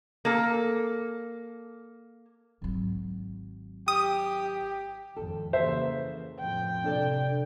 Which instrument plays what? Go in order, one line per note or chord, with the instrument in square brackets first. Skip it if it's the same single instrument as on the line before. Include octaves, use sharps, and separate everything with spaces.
[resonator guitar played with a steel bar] A#3 A4
[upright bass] G#1 F#3
[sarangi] G4 [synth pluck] D#6
[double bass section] G#1 F2 [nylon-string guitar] A4
[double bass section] C#3 E3 A#3 [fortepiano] C5 E5
[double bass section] F2 A2 [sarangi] G5
[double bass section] C3 [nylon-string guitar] D4 A4 D5